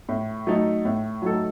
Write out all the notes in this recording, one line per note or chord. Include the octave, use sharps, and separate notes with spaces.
A2
F#3 A3 D#4 A4
A2
F#3 A3 D#4 A4